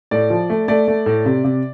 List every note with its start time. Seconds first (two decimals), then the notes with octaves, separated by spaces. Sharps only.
0.11 A2 D5
0.30 F3
0.50 A3
0.68 A3 D5
0.88 A3
1.06 A2
1.25 C3
1.44 C3